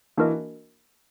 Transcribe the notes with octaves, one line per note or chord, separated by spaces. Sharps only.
E3 A#3 D4 F#4 A#4 D#5